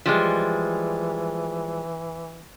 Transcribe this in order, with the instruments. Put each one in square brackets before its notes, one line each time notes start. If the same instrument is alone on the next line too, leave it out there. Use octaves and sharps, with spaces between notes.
[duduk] E3 [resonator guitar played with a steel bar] F3 G3 G#3